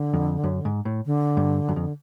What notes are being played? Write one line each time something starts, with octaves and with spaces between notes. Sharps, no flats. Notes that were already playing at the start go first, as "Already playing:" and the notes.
Already playing: D3
F2
F#2
G#2
A2
D3
G2
F#2
F2